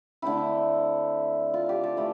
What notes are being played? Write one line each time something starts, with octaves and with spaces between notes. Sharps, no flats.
D3 A3 C4 E4
F4
G4
A4
E3 A3